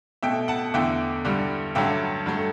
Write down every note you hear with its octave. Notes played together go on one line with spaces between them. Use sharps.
B2 A3 E5 G5
F#5 A5
E2 D3 A3 E5 G5
G2 D3 G3
G2 D3 F#3 A3 E5 G5
G2 F#3 A3